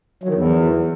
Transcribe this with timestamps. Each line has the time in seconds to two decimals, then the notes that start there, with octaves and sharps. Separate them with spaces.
0.24 F#3
0.29 D#3
0.34 E2